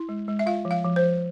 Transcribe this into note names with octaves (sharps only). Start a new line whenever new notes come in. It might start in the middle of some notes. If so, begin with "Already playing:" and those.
Already playing: E4
G#3
G#3
E5
F4 F5
F3
F5
F3
C5
F3